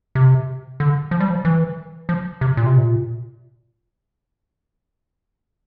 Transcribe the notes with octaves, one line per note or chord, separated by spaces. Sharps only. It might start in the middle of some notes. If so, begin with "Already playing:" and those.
C3
D3
F3
G3
F3
E3
F3
C3
A#2
C3
A#2